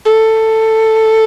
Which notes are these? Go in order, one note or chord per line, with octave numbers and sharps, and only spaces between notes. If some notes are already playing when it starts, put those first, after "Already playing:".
A4